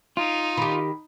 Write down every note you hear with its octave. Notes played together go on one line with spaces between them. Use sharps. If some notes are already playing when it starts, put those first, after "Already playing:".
D#4 F4
D#3 G4 B5